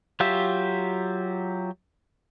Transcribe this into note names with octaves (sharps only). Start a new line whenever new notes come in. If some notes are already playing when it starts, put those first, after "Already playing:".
F#3 F4 G4 E5